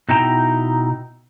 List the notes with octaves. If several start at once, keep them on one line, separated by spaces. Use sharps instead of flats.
B2 D#4 E4 G5 A5 A#5